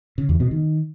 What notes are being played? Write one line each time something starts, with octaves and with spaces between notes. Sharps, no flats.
C#3
E2
B2
D#3